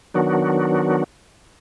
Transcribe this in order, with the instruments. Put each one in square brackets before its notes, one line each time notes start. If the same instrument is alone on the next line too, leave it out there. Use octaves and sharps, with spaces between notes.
[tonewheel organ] D#3 F#3 B3 D4 F#4